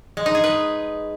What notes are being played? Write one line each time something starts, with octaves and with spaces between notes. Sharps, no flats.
G#3
D#4
G#4
B4